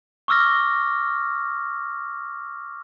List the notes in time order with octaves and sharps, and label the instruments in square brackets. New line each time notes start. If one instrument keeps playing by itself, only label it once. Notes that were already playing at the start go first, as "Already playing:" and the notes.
[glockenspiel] C#6 D6 E6 F6 A#6